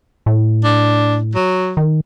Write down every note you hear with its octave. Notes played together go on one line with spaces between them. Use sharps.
A2
D4
F#3
D#3